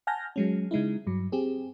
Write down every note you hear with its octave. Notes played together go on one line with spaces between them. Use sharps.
F#5 G#5 A5 F6 G6 A#6
F#3 G#3 C#4
C#3 G#3 D#4 E4
G2 F#3
C4 G4 G#4